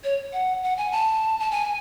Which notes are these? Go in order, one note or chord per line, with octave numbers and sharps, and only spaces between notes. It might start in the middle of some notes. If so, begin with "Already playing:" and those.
C#5
F#5
F#5
G#5
A5
A5
G#5